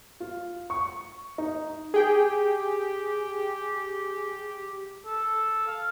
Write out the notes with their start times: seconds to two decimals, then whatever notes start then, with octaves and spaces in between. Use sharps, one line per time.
0.20 F4
0.70 C#6
1.38 D#4
1.94 G4 G#4 G5
5.06 A4
5.68 F5